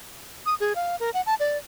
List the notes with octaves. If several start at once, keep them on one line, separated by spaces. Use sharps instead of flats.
D#6
G#4
F5
A#4
F#5
A5
D5